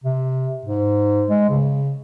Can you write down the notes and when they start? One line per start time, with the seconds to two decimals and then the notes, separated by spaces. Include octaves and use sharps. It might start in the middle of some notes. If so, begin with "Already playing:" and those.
0.04 C3
0.66 G#2
1.30 G#3
1.50 C#3